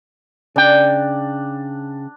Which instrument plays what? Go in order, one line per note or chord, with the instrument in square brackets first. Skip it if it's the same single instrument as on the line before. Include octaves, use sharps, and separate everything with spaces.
[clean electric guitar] C#3 G5 [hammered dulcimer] D4